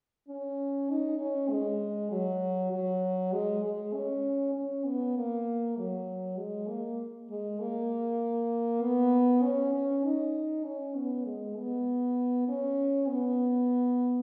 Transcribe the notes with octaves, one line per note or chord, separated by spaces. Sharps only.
C#4
D#4
C#4
G#3
F#3
F#3
G#3
G#3
C#4
C#4
B3
A#3
F#3
G#3
A#3
G#3
A#3
B3
C#4
C#4
D#4
C#4
B3
G#3
B3
C#4
B3